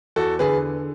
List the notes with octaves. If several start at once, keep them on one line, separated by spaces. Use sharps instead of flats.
E2 F#4 A4
D3 G#4 B4